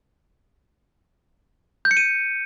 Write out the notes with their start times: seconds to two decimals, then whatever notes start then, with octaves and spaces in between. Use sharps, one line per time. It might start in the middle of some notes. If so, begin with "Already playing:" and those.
1.85 G6
1.91 C#7
1.97 D#7